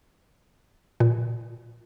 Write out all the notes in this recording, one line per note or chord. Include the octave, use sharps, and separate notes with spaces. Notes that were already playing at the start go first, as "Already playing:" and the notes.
A#2